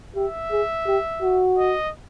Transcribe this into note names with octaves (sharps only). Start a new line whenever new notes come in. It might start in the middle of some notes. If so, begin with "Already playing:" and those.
G4 E5
G#4
G4
F#4
D#5